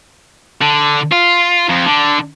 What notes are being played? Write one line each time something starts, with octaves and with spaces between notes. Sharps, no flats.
D3
F4
F2
D3